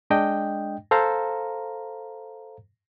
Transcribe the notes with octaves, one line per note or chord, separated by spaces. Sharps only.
G#3 D4 D#5 G5
A4 C5 F5 A#5